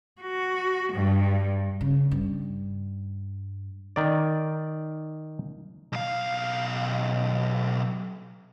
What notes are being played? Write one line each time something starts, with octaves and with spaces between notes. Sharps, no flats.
F#4
G2
C#3
G2
D#3 D5
B1 F5